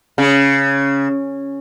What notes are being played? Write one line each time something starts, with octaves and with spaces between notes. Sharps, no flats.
C#3